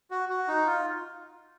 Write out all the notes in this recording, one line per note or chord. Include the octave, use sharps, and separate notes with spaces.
F#4
F#4
D#4
F4